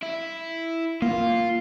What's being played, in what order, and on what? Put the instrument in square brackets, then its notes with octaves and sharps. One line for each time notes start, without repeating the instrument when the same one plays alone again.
[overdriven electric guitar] E4
[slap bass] A#3 [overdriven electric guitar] F4